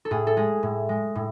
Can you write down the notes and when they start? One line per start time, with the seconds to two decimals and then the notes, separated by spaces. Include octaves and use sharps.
0.05 A4
0.11 A2 G#4
0.27 A4
0.37 G#3 G#4
0.63 A2
0.89 G#3
1.15 A2